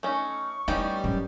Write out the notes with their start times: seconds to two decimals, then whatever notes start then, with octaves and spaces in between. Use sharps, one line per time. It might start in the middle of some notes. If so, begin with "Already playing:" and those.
0.03 A3 C#4 D#4 C#6
0.68 G3 B3 C#4 D#4 E4 G5
1.04 F#2